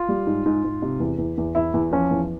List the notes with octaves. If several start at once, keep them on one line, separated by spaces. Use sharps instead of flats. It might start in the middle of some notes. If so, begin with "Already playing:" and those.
Already playing: F4
G3
G#2
G#2
G#2
C3
E2
E2
E2
E2 E4
E2
F3 C#4
E2